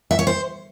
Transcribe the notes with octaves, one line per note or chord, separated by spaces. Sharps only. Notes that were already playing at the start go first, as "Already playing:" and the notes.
E5
C#5
C5